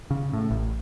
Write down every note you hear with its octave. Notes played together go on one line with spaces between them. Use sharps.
C#3
A2
A1